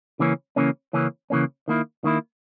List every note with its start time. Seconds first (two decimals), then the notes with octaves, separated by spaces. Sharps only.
0.19 C#3 E3 A#3 C#4
0.56 C#3 E3 A#3 C#4
0.93 C#3 E3 A#3 C#4
1.30 C#3 E3 A#3 C#4
1.68 D#3 A#3 E4
2.04 D#3 A#3 E4